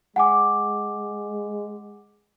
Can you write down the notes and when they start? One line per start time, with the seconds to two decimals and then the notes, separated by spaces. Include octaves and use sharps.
0.16 G#3 F#5 G#5 D6